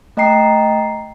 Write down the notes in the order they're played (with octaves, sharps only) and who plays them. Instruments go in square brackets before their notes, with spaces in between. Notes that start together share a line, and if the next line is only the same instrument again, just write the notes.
[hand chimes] A3 D#5 G5 A#5 C7